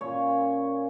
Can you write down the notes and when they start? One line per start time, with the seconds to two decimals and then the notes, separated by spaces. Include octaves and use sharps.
0.01 A#2 A#3 C#4 C#5